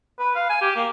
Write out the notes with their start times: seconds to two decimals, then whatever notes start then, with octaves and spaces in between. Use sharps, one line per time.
0.19 B4
0.36 F5
0.50 G#5
0.62 G4
0.76 A#3